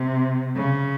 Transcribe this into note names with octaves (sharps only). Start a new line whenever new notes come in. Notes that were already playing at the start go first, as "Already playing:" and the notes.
Already playing: C3
C#3